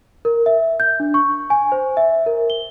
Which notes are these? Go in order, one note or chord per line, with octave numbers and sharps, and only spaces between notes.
A#4
E5
G6
D4
C#6
G#5
C5
E5
A#4
G7